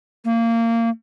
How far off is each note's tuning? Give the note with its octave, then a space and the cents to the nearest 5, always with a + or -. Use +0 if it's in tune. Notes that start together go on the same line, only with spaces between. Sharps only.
A#3 -20